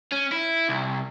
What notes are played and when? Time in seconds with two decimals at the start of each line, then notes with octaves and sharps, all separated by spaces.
0.12 C#4
0.32 E4
0.69 C2